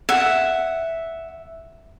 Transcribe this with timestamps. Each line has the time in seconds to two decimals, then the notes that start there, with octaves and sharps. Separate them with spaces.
0.09 E5 F#5